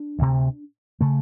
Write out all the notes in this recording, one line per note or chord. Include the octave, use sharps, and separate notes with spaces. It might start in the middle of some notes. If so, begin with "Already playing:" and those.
Already playing: D4
D2 C3
C#3 A3